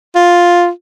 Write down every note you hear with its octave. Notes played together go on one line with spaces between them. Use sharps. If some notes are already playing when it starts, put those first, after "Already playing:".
F4